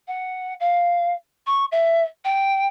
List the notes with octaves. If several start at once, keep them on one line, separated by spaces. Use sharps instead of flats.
F#5
F5
C#6
E5
G5